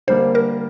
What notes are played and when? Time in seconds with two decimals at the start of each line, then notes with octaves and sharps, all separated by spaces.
0.08 D3 G3 A#3 C5
0.35 A#4